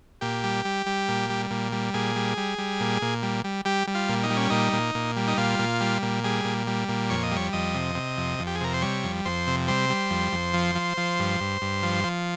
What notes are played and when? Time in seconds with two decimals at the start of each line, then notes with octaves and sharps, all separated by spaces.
0.21 A#2 G4
0.44 G3
0.65 G3
0.86 G3
1.08 A#2
1.30 G3
1.51 A#2
1.72 G3
1.94 A#2 G#4
2.16 G3
2.37 G3
2.58 G3
2.80 A#2
3.02 A#2
3.23 G3
3.44 G3
3.65 G3 G4
3.87 G3
3.95 F4
4.09 A#2
4.23 D#4
4.30 G3
4.37 C#4
4.50 A#2 D#4
4.73 A#2
4.95 A#2
5.17 G3
5.28 D#4
5.38 A#2 F4
5.59 A#2
5.81 G3
6.02 A#2
6.24 G3 G#4
6.45 A#2
6.67 G3
6.88 A#2
7.10 F2 C#5
7.23 D#5
7.31 G3 C#5
7.53 F2 D#5
7.75 C3
7.95 C3
8.17 F2
8.39 F2
8.47 G4
8.55 G#4
8.61 C3 A#4
8.74 C5
8.82 G3 C#5
9.04 F2
9.25 F2 C5
9.47 C3
9.68 G3 C5
9.89 G3
10.10 F2
10.32 F2
10.54 F3
10.75 F3
10.97 F3
11.19 G2
11.41 G2
11.62 G2
11.83 F3
12.04 F3